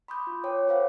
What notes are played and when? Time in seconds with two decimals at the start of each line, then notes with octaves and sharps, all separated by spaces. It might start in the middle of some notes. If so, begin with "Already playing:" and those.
0.08 B5 C6 D6 D#6 G6
0.27 F4
0.44 C#5 G5 D6
0.68 A#4 C5 F5 F#5